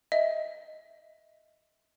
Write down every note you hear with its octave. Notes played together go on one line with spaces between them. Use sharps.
D#5 E5